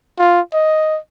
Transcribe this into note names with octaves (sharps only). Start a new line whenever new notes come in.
F4
D#5